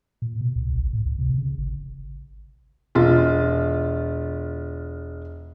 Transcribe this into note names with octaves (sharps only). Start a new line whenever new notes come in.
A#2
B2
C#2
A1
A2
C#2
C3
C#3
G#1
E1 F4